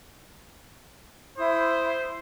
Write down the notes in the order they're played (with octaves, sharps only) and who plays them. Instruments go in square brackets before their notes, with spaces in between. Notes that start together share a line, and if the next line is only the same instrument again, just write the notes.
[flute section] E4 D#6 [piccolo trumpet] C5